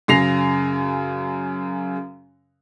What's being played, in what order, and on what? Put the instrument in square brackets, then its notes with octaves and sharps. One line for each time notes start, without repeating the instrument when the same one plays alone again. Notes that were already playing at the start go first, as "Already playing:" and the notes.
[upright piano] F#2 C#3 A#6 C7 F7